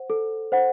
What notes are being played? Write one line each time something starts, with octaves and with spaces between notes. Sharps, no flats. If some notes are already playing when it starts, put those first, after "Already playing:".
Already playing: C5 F#5
A4
C5 F#5